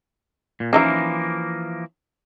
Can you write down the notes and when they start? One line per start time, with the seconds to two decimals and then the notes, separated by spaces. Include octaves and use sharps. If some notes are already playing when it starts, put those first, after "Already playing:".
0.60 A#2
0.73 E3 F3 A#3 C#4 D#4 E5